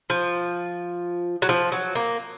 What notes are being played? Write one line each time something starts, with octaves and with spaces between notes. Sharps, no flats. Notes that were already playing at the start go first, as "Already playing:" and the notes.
F3
F#3
F3
F#3
A#3